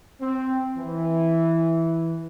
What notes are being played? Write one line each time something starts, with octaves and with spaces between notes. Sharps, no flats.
C4
E3